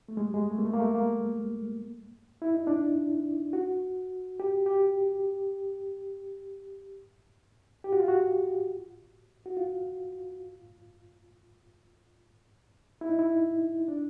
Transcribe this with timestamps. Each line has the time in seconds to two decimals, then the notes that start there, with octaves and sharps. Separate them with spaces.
0.09 A3
0.17 G#3
0.25 G3
0.34 G#3
0.51 A3
0.58 A#3
0.65 A3
0.73 A#3
0.80 A3
0.95 A#3
2.42 E4
2.55 D#4
2.67 D4
3.53 F#4
4.40 G4
4.66 G4
7.84 G4
7.93 F#4
8.00 F4
8.08 F#4
9.46 F#4
9.57 F4
13.01 E4
13.09 D#4
13.19 E4
13.88 D4